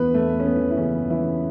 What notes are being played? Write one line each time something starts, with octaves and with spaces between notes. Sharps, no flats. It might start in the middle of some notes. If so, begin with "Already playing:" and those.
Already playing: E2 E3 A3 B3 B4
E2 A3
A3 C#4
B3
E3
E4
E2 C#3 C#4
E2
E3 E4
A3